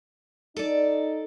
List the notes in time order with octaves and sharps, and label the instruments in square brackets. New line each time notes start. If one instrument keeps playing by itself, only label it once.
[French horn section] D#4 [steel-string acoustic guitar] A4 D5